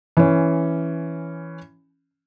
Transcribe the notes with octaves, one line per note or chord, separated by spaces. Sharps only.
E3 C#4